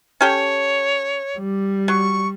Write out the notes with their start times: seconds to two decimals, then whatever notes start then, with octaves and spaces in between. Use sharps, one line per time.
0.21 C#4 G4 A4 C#5
1.38 G3
1.88 F#3 C#6